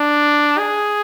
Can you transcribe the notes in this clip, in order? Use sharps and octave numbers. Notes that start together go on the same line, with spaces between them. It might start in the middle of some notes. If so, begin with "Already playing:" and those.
Already playing: D4
G#4